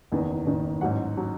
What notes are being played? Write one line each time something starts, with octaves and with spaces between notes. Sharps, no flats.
F#1 E2 D#3
F#1 E2 D#3
A1 G#2 F#3 F#4 F#5
F#3